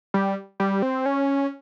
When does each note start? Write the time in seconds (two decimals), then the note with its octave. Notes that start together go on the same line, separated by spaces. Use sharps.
0.14 G3
0.60 G3
0.82 C4
1.06 C#4